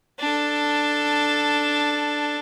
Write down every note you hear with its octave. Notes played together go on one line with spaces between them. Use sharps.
D4 A4